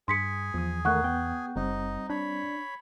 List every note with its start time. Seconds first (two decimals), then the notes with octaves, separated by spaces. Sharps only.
0.08 G2 G#4 C6 B6 C#7
0.54 E2 F3 D#6
0.85 D#3 A3 A#4 F#5 C#6 F#6
1.04 B3 G5 G6
1.56 F#1 G3 C4 D#4
2.10 D4 C#5 B5